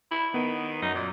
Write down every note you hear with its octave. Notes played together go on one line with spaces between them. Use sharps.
E4
D#3 B3
F#2 D#4
A#2